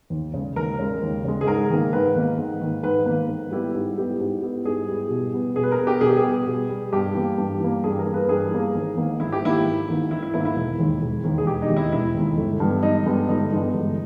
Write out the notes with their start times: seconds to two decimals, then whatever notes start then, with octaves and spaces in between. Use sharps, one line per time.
0.10 D#2
0.34 C#3 G#3
0.56 D#2 A#4
0.79 C#3 G#3
1.02 D#2
1.24 C#3 G#3
1.41 G#4
1.46 G#2 A#4
1.70 D#3 A#3
1.93 G#2 B4
2.16 D#3 A#3
2.38 G#2
2.61 D#3 A#3
2.83 G#2 B4
3.06 D#3 A#3
3.28 G#2
3.51 G3 B3 E4 G4
3.75 G#2
3.97 G3 B3 E4 G4
4.20 G#2
4.42 G3 B3 E4 G4
4.65 G#2 G#4
4.88 G3 B3 E4 G4
5.10 B2
5.33 G3 B3
5.56 B2 G#4
5.63 B4
5.72 A#4
5.79 G3 B3
5.87 G4
6.01 B2 G#4
6.09 G4
6.17 G#4
6.24 G3 B3
6.47 B2
6.69 G3 B3
6.93 G2 G4
7.14 E3 A#3
7.38 G2
7.60 E3 A#3
7.83 G2 G#4
7.99 A#4
8.06 E3 A#3
8.14 B4
8.28 G2 G#4
8.51 E3 A#3
8.75 G#1
8.97 G#2 D#3 A#3
9.20 G#1 E4
9.32 G4
9.42 G#2 D#3 A#3 E4
9.66 G#1
9.88 G#2 D#3 A#3
10.11 G#1 E4
10.22 E4
10.34 G#2 D#3 A#3 E4
10.45 E4
10.56 E1
10.79 D#2 D#3 G#3
11.02 E1
11.24 D#2 D#3 G#3
11.38 G#4
11.47 E1 G4
11.62 D#4
11.69 D#2 D#3 G#3
11.77 E4
11.92 E1 E4
12.15 D#2 D#3 G#3
12.38 G1
12.60 G2 E3 G#3 B3
12.83 G1 D#4
13.06 G2 E3 G#3 B3
13.29 G1 D#4
13.52 G2 E3 G#3 B3
13.74 G1